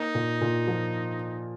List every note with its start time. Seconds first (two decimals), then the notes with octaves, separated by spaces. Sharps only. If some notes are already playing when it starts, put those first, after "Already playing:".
Already playing: A#3 D#4
0.15 A#2
0.41 A#2
0.68 F3